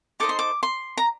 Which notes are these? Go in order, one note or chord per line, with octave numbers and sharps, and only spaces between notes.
D#4 A4 C5 D#5 D6
C6
D6
C6
A#5